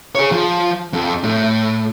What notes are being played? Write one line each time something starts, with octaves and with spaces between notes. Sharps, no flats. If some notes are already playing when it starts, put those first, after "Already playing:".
G#4 C#5
F3
F2
A2